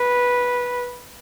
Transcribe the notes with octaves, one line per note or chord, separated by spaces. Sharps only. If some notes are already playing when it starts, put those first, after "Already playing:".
Already playing: B4